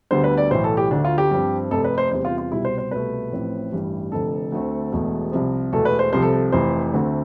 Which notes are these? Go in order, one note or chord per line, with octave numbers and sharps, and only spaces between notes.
D2 D3 G3 B3 C5
B4
D5
B1 A2 E3 C5
A4
G4
D2 D3 A3 D4
F4
G4
G2 F3 C4
F1 F2 C3 A4
B4
C5
E2 C3 G3 C5
F4
F4
C2 B2 G3 E4
C5
C5
C2 B2 A3 B4
A1 A2 F3 C4
A1 G2 E3 G3
F1 F2 D3 A4
D2 D3 A3 C4
E1 E2 B2 A3
C2 C3 F3
E1 E2 B2 A3 A4
B4
C5
C2 C3 F3 C5
A4
A4
F1 F2 E3 C5
D2 D3 A3 C4